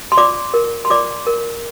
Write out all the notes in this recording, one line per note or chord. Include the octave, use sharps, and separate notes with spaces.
C6
F4 D5 D6
A#4
C6
F4 D5 D6
A#4